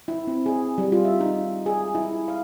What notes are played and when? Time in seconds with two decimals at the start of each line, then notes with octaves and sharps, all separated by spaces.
0.08 E4
0.27 C4
0.46 G#4
0.78 G3
0.92 F4
1.05 E5
1.21 D#4
1.66 G#4
1.95 E4
2.28 F5